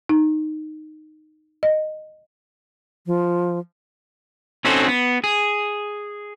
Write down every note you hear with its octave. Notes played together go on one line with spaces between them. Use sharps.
D#4
D#5
F3
C4 C#4 D#4 F#4 A4 C5
B3
G#4